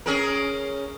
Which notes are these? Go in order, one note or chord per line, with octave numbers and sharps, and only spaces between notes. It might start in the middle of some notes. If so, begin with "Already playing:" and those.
C#4 G#4 A#4